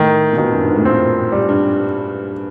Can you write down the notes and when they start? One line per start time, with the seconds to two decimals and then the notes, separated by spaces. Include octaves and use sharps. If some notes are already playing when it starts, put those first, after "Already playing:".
Already playing: A2 D#3
0.33 A#2
0.37 B2 D#3
0.52 F#2
0.61 G2
0.69 G#2
0.76 A2
0.84 A#2 C4
1.32 G3
1.49 G2